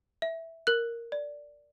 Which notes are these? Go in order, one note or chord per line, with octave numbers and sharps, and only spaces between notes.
E5
A#4 F#6
D5